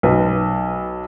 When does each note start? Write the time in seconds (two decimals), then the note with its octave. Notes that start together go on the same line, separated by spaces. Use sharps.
0.03 B1 B4